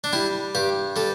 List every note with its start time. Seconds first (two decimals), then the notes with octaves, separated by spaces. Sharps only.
0.04 D4
0.13 G3 E4
0.55 G2 G4
0.96 G3 A4